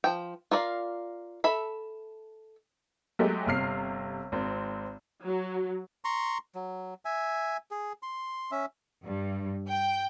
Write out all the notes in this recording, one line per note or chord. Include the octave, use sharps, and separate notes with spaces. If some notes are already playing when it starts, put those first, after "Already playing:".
F3 G5
F4 A#4 D5 F5
A4 E5 B5
F#3 G#3 A3 G4
G1 C3 F6 C7
G#1 C4
F#3
A#5 C6 C#6
F#3
E5 G#5
G#4
C6
C#4 E5
G2
G5